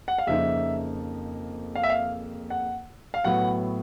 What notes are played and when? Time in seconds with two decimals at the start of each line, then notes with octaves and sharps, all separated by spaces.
0.08 F#5
0.18 F5
0.27 F2 C#3 F3 A#3 D#4 E5
1.75 F5
1.83 E5
1.90 F5
2.50 F#5
3.14 F5
3.24 A2 F#3 B3 F#5